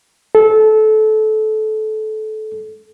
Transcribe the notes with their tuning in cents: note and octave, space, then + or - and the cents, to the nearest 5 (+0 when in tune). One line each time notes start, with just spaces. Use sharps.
A4 -25